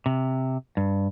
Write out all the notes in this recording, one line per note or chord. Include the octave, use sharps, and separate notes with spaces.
C3
G2